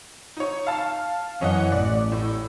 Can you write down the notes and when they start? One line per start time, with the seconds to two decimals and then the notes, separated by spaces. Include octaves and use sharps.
0.37 D#4 C#5
0.67 F5 A5
1.41 F#2 E3 C#4 D#5 F#5
1.72 A1 D5
2.12 A2